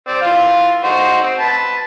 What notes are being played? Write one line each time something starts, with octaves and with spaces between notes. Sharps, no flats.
C4 D5
E3 F4 F5
D#4 F#4 C5
C4
B4 A5